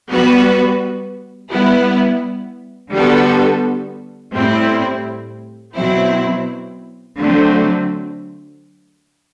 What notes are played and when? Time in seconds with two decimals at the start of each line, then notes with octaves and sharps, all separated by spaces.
0.10 G3 B3 F#4 B4
1.51 G3 B3 E4
2.93 D3 G3 B3 F#4 A4
4.34 A2 G3 C4 E4
5.76 B2 F#3 C4 E4
7.17 D3 F#3 A3 C4